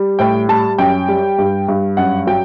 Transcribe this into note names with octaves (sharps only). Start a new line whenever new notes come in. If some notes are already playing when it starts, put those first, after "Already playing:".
Already playing: G3
A2 G5
G3 A5
F#2 G5
G3
G2
G2
F#2 F#5
F#3 G5